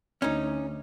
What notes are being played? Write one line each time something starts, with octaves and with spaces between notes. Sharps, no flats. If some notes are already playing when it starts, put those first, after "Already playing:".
D2 C#4 D#4